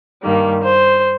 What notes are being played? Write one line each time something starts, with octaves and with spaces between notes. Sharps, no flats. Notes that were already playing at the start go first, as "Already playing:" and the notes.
G2 D#3 G3 A#3
C5